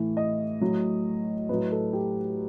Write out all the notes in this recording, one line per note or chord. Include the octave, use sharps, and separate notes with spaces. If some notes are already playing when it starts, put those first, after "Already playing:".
Already playing: A2 E3
D#5
A2 F#3
A2 F#3 B4
A4
G4